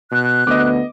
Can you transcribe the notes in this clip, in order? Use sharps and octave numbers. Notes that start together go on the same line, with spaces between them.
B2 F#6
D2 B3 D#5 D6